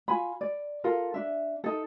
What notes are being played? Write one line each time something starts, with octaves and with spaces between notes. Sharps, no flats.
F4 G#5 B5
D5
F4 A4 A#4
D4 E5
D#4 A4